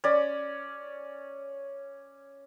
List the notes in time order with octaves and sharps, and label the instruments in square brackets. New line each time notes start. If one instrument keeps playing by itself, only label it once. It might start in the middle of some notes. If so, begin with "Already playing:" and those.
[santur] C#4 D5